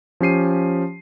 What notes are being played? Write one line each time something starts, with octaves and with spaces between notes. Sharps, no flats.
F3 C#4 G4 C7 D#7